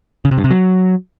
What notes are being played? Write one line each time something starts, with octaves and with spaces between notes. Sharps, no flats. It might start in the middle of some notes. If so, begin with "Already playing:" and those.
C#3
C3
G2
C3
F#3